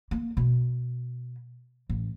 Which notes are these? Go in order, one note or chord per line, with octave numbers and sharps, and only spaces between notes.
A#3
B2
A1